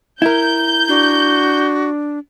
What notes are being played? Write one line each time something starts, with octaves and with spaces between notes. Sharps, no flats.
E4 A#4 G6
D4 F#4